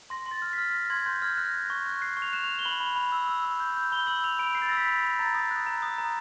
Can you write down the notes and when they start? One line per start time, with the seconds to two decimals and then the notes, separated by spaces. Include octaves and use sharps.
0.10 C6 A#6
0.26 C6
0.31 A6
0.42 F6
0.53 F6 B6
0.74 F6 A#6
0.90 C6 G#6
1.06 C6 G6
1.22 F6 G#6
1.37 F#6 A#6
1.53 F#6
1.70 C#6
1.86 F#6
2.01 F#6 C7
2.17 C#6
2.22 F7
2.33 F#6 E7
2.44 F#6 F7
2.59 G7
2.65 B5 F#7
2.80 B5
2.96 B5
3.12 E6
3.28 E6
3.45 E6
3.60 G6
3.77 G6
3.92 B5 G7
4.07 E6 F#7
4.24 E6 F7
4.39 B5 D7
4.55 G6 C7
4.62 A6
4.69 A#6
4.72 E6
4.77 B6
4.87 B5
4.98 A#6
5.03 B5
5.19 A#5 A6
5.34 D#6
5.51 F#6
5.66 A#5
5.82 D#6
5.98 A#5